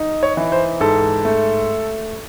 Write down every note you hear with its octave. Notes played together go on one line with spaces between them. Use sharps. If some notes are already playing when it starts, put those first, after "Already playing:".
Already playing: D#4
C#5
E3
C5
G#2 A4
A3